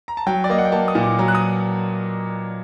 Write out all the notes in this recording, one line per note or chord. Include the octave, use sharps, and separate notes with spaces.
A#5
A5
F#3 G5
D5
A#3 D#5
F#5
G5
A#3 A5
D#6
A#2
D6
F#3 A#5
F#6
D#6